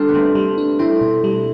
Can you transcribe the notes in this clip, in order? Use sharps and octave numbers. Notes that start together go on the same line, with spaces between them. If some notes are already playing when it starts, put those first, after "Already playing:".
Already playing: G3 D4 F4 G4 A4
B3
G3 A3 C4
G3
D4
A3 C4 E4
B2
G3